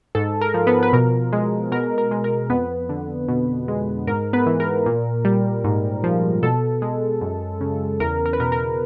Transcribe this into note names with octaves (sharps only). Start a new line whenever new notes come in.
G#2 A4
A#4
F3
B3 B4
B4
B2 A#4
G#3
B2 A#4
A#4
G#3
A#4
F2 B3 B4
D3
B2
G#3
G#2 A#4
B3 B4
E3
A#4
A#2
G3
G#2
F3
B2 A4
G#3
F#2
C#3
E2 A#4
A#4
B4
B2 A#4
A#4